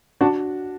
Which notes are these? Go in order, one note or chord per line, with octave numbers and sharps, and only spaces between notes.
D4 F#4